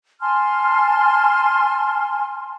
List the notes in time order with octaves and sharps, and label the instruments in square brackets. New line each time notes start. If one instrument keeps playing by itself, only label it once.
[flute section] G#5 A5 C6 F6